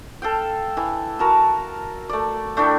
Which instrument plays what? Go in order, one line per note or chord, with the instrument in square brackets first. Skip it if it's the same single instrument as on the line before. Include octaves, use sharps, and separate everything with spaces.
[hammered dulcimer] A4 F5 G5
E3
F#4 A#4 A5
A3 D5
A3 D4 E4 G5